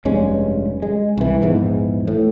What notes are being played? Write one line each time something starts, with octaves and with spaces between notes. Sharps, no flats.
F1 G2 G#3 C#4
G#3
C2 E3
A#1 E2 G#2 E3
A2